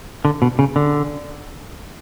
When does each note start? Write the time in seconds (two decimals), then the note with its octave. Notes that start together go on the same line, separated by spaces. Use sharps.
0.25 D3
0.42 B2
0.59 C#3
0.76 D3